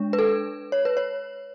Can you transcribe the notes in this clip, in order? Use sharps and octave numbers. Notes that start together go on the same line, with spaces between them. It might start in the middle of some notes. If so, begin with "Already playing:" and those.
Already playing: G#3 D4
B4
A4
C#5
B4
C#5